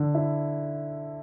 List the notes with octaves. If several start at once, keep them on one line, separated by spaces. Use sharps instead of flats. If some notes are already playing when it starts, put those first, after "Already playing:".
Already playing: D3
E4